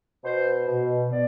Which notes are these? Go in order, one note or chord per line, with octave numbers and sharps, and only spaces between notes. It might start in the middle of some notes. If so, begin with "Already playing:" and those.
B2 C5
B2
B3 D5